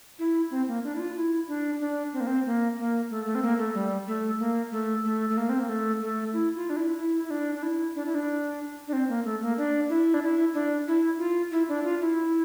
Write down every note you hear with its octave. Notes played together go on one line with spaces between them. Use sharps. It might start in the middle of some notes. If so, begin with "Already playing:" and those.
E4
C4
A#3
D4
E4
F4
E4
D4
D4
C4
A#3
C4
A#3
A#3
A3
A3
C4
A#3
A3
G3
A3
A#3
A3
A3
A3
A#3
C4
A#3
A3
A3
E4
F4
D4
E4
E4
E4
D4
D4
E4
D4
E4
D4
D4
C4
A#3
A3
A#3
D4
E4
D4
E4
D4
E4
F4
E4
D4
F4
E4